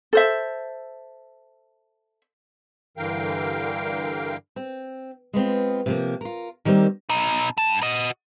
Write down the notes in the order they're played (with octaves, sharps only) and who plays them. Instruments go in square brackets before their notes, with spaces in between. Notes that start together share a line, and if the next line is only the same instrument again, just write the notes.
[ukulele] A4 C5 E5
[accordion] G2 D3 E3 A#4 F5 G5
[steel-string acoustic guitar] C4
G#3 B3 C4 F4
C3 F3 A#3
F4 A#4
D#3 G3 A#3 C4
[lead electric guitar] B2 D#4
G2 A5
F#4 D#5